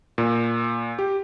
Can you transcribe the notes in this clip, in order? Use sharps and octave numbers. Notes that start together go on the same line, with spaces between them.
A#2
G4